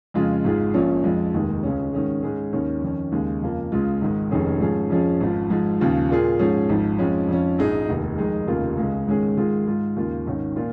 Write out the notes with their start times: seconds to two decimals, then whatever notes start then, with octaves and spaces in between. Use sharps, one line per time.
0.14 F2 C#3 G#3 F4
0.44 G#1 G#2 G#3 F4 G#4
0.74 A#1 A#2 F3 C#4
1.04 F2 F3 G#3
1.34 F1 D#2 D#3 G#3
1.63 C#2 C#3 G#3 C#4
1.93 G#2 D#3 C#4 G#4
2.23 G#2 G#3 C#4 G#4
2.53 D#2 D#3 C#4
2.82 F2 D#3 C#4
3.12 D#2 C#3 G#3
3.42 F2 C#3 F3 A#3
3.72 C#2 C#3 G#3 F4
4.02 G#1 G#2 D#3 G#3
4.31 F1 F2 D#3 C#4 G#4
4.60 G#2 F3 C#4 G#4
4.90 F2 F3 C#4 G#4
5.20 G#1 G#2 F3
5.50 G#2 F3 G#3
5.80 D#2 C#3 F3
6.10 A#2 A#3 F4 G#4
6.39 G#2 F3 C#4 G#4
6.69 G#1 G#2 F3
6.99 F2 F3 G#3 C#4
7.29 F2 F3 C#4
7.58 A#1 G#2 G#3 D#4 G#4
7.88 F1 D#2 D#3
8.18 F2 D#3 G#3 D#4 G#4
8.48 F1 D#2 C#3 A#3 F4
8.77 C#2 C#3 G#3
9.07 G#2 D#3 G#3 C#4 G#4
9.37 G#2 D#3 G#3 F4 G#4
9.67 G#2 G#3 F4
9.96 D#2 C#3 A#3 F4
10.26 G#1 G#2 D#3 C#4
10.56 A#2 A#3 F4